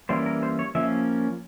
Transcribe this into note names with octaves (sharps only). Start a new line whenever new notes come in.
E3 G3 A#3 C#4 C5
A#4
C5
C#5
F3 A#3 C#4 E5